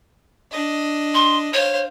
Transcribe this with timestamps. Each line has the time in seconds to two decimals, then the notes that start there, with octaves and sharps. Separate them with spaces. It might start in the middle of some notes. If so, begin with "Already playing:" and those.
0.52 D4 D#5
1.15 C6
1.54 C5 C#5 F5